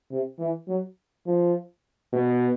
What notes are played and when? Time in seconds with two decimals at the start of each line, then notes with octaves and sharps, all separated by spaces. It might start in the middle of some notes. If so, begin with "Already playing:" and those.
0.11 C3
0.39 E3
0.68 F#3
1.27 F3
2.13 B2